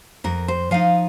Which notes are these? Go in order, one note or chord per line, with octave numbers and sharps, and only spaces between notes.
F2 A#4
C5
F3 D#4 F5